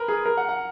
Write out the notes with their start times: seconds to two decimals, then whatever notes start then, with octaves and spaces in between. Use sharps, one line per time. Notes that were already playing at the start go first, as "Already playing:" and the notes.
Already playing: A#4 B4
0.08 G#4
0.26 A#4
0.37 F#5
0.49 F#5